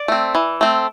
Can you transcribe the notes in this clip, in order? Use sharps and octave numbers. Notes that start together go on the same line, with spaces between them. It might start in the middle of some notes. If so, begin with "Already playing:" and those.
Already playing: D5
A3 C4
E3
A3 C4